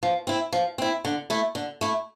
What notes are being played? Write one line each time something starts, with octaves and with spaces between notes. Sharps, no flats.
F3
C4 E4
F3
C4 E4
D3
A3 E4
D3
A3 E4